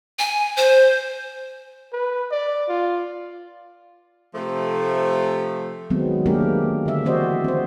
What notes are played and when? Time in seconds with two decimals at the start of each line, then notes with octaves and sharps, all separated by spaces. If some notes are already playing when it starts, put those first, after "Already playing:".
0.19 G#5
0.57 C5
1.93 B4
2.31 D5
2.69 F4
4.34 C3 F3 A3
5.90 D#3 F#3 G#3 B3 C4
6.26 A3 A#3 D4 G4 G#4 A#4
6.86 D3 E5
7.05 E3 C4 F#4 C5 D5 D#5
7.44 C4 C5